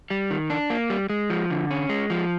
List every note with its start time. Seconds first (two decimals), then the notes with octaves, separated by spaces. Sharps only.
0.10 G3
0.30 D#3
0.50 D4
0.70 A#3
0.90 G3
1.10 G#3
1.30 F3
1.50 D3
1.71 C#4
1.89 G#3
2.10 F3